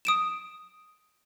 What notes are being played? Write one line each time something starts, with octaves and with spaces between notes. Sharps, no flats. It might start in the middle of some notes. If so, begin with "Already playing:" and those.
D#6 D7 E7